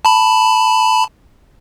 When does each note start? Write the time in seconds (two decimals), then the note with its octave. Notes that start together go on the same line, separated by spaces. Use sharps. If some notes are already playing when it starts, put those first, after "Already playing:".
0.05 A5 B5